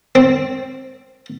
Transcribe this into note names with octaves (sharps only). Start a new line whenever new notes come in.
C4